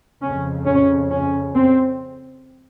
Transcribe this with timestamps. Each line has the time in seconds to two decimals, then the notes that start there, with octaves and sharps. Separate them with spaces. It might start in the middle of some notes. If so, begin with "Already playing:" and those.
0.22 F2 C#3 C#4
0.66 C#4
1.11 C#4
1.55 C4